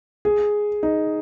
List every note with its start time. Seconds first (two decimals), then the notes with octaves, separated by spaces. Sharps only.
0.25 G#4
0.83 D#4